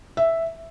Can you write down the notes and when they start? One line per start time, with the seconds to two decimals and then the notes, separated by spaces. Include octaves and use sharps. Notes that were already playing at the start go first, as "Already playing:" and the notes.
0.17 E5